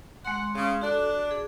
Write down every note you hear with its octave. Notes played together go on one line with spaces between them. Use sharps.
G#3 F#5 C6
C#3
D4 F#4 A4
F#4
G#4